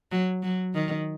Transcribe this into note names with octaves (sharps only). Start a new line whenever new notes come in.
F#3
F#3
D#3